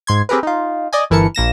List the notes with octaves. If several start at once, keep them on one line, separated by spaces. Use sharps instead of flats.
G#2 C6 G#6
C4 G4 G#4 A#4 B4
D#4 F4
D5 D#5 G#5
G1 E3 E4 A#4 A5 C#7
A#1 A#3 A#6 E7